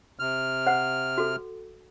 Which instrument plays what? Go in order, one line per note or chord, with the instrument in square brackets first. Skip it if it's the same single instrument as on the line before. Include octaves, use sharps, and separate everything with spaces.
[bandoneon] C3 F6
[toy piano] C5 F#5
F#4 A4